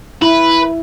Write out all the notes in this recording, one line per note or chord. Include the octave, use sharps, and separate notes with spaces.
E4 B4